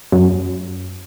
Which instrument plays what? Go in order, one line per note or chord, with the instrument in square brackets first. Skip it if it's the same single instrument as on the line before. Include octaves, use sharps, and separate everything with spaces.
[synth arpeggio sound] F#2